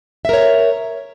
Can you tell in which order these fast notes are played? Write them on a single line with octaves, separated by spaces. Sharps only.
E5 A#4 C#5